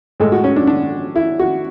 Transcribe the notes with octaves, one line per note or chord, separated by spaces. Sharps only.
A2 G#3 A4
F#4
C#4
D4
D4
E4
F#4